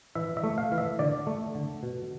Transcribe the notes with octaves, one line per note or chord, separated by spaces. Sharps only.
E3 E5
E5
A3
F5
E3
E5
D3 D5
A3
D3
B2